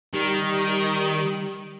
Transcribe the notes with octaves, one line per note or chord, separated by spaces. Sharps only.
D#3 G3